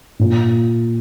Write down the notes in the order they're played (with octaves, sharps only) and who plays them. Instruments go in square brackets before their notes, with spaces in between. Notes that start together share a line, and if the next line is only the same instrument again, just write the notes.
[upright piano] A#2